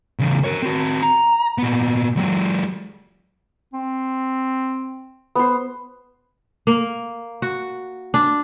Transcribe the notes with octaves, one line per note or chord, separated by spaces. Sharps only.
E2 C#3
A#4 C#5
C4 F#4
A#5
A#2 B3
F#3 G#3
C4
B3 C5
A#3
F#4
D4